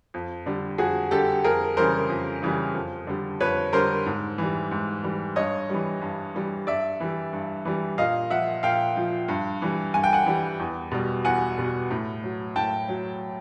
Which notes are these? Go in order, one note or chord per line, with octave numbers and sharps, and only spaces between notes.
F2
D3 G3
F2 F#4 G#4
D3 G3 G4 A4
F2 G#4 A#4
C#3 E3 G3 A#4 C5
F2
C#3 E3 G3
F2
D3 G3
F2 B4 C#5
D3 G3 A#4 C5
G#2
E3 G3
G#2
E3 G3
G2 C#5 D#5
E3 G3
G2
E3 G3
G2 D5 E5
E3 G3
G2
E3 G3
A#2 D#5 F5
F3 E5 F#5
A#2 F5 G5
F3
G2
E3 G3
G2 G#5
G5
F#5 G#5
E3 G3
E2
B2 G3
E2 F#5 G#5
B2 G3
A2
F#3
A2 G5 A5
F#3